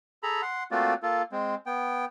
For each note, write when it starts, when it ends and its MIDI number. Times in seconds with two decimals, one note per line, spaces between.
0.23 0.41 68
0.23 0.41 69
0.23 0.41 82
0.23 0.41 83
0.42 0.63 78
0.42 0.63 84
0.71 0.94 57
0.71 0.94 58
0.71 0.94 60
0.71 0.94 65
0.71 0.94 66
0.71 0.94 74
1.03 1.22 58
1.03 1.22 65
1.03 1.22 69
1.32 1.55 56
1.32 1.55 60
1.66 2.05 59
1.66 2.05 79